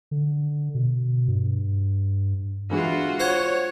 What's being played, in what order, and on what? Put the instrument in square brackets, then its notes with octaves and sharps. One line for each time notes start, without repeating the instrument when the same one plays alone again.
[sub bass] D3
B2
G2
[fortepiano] D3 E3 G#3 [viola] F4 F#4
[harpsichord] C5 F#5 [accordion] C#5